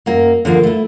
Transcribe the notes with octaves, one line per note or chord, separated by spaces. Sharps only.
F#2 A#3
D3 F3 A#3
A3 E4